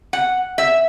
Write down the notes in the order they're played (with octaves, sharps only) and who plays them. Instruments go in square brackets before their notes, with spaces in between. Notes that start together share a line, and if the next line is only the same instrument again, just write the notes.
[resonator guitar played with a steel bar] F#5
E5